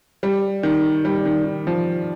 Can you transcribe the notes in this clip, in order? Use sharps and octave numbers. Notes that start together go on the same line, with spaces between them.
G3
D#3
G3
D#3
D#3
F3